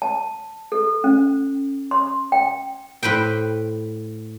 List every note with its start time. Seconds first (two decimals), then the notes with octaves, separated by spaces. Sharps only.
0.02 A5
0.72 A4
1.04 C#4
1.91 C6
2.32 G5
3.03 A2 B4 C5 G5